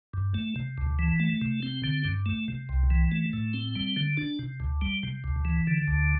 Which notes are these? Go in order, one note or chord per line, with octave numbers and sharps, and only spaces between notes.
G2
A3
C3
D2
E3
A3
C3
C4
D3
G2
A3
C3
C2
E3
A3
A2
C4
G3
D3
D4
C3
D2
G3
C3
D2
E3
D3
D2